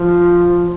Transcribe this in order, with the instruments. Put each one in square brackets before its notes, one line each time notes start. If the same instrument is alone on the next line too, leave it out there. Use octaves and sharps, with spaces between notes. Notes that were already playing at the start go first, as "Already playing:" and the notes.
Already playing: [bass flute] F3